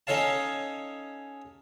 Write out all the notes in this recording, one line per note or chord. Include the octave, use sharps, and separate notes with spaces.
C#4 D#4 A4 C#5 F5 A5